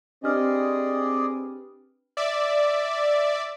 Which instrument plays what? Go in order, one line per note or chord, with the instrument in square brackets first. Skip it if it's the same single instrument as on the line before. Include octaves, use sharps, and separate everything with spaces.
[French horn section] C4 B4 [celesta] D4 G4 F6 [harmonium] G#4 D5 D#5
[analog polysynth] D5 E5